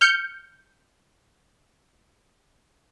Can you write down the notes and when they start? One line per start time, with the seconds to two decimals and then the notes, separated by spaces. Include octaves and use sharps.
0.01 F6 G6 C#7